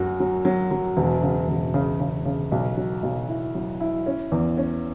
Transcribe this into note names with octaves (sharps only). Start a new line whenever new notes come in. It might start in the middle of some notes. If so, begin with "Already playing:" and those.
Already playing: F#2 F#4
F#3
F#3
F#3
E1
C#3
E1
C#3
C#3
C#3
B1
F#3
B1
E4
F#3
E4
C#4
E2
C#4